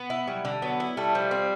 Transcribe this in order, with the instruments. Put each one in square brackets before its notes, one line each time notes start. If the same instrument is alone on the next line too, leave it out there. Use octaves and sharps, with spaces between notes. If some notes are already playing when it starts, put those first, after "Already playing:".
Already playing: [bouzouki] B3
E4
[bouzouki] F#3 [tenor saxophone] G3
[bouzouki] D3
[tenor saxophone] F#3 [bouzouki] B3
[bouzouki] E4
[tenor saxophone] G3 [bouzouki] A3
[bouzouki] F3
C4